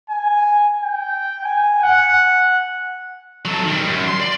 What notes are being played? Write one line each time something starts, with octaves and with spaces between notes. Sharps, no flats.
G#5
G5
G#5
F#5
F#3 A4
D#3 G3
F#2
C6
D5